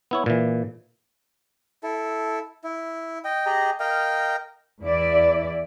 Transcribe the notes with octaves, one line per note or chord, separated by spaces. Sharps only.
B3 E4 C#5
A#2 E3
E4 A4
E4
D#5 G5
G4 G#4 D#5 A#5
A#4 D#5 F5 G5
E2 E4 D5